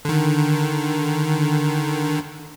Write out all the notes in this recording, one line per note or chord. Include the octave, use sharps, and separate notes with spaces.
D3 D#3